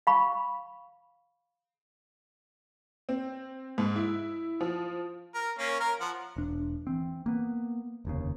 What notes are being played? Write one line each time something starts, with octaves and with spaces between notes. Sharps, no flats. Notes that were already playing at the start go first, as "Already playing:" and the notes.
F5 B5 C#6
C4
G#2
E4
F3
A#4
A#3 C#4
A#4
F3 F#5
E1 D4
E3 C4
A#3 B3
F1 D#2 C#3